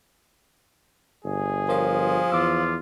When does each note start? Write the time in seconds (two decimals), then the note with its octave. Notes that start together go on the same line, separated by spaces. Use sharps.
1.25 G1 G#4
1.69 F3 A#4 C#5 C6
2.32 E2 F4 D6 E6